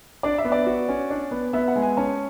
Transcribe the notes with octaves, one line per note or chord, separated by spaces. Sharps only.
D4 D5
E5
B3
D5
F#4
C#4
D4
B3
B3 E5
F#5
G#3
G#5
C#4 A5